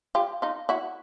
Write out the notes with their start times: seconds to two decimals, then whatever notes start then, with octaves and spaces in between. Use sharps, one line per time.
0.15 F4 G4
0.42 D#4 F4
0.69 E4 F#4